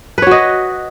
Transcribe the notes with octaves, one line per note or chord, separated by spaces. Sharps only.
F#4 B4 C#5 D#5